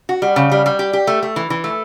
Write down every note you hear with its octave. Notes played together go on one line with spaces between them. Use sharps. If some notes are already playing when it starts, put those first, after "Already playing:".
F#4
G3
C#3
G3
G3
G4
G4
A3
A3
E3
E3
A3